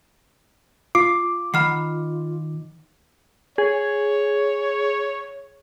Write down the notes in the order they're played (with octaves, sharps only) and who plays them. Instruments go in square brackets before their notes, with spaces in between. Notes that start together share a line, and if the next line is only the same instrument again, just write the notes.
[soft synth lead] F4 [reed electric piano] D6 [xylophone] C7
[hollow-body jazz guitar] D#3 F#5 [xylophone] B5 F6 C7
[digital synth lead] G#4 [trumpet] C#5